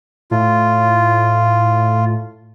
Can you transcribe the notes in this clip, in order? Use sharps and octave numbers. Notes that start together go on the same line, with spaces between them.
A2 F4